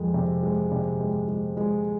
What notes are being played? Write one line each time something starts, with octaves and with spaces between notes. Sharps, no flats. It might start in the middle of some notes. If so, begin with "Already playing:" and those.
Already playing: F2 G#3
C3
G#3
C3
G#3
G#3
G#3